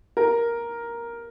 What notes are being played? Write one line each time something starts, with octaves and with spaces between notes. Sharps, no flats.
A#4